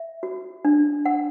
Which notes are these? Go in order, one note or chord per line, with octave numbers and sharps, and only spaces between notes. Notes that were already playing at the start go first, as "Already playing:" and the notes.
Already playing: E5
F#4
D4
F#5